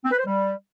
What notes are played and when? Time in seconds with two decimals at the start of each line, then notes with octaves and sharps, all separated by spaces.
0.04 C4
0.11 B4
0.18 C5
0.25 G3